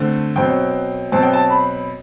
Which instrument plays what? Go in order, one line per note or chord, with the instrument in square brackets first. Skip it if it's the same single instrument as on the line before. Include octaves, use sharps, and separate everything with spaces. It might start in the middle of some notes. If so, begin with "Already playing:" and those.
Already playing: [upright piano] D3 A3 C4
B2 F#3 C4 G5
B2 F#3 C4 A5
G5
A5
B5